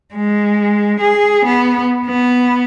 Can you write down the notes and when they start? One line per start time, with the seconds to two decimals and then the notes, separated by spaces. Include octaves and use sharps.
0.15 G#3
1.01 G#4
1.46 B3
2.06 B3